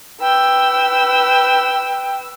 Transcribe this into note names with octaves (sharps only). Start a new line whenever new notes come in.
B4 G5 E6